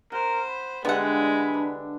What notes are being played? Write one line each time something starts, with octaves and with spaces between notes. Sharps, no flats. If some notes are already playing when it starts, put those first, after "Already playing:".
A#4 C5 F#5
B5
D3 E3 G3 G#3 B3 F#5
D4